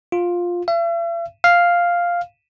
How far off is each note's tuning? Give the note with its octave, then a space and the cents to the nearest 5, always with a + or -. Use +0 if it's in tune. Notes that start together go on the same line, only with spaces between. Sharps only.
F4 +10
E5 +45
F5 +0